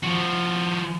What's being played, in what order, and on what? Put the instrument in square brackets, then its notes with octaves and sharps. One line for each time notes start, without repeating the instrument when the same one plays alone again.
[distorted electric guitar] F3 F#4